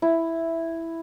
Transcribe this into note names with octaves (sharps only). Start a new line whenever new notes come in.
E4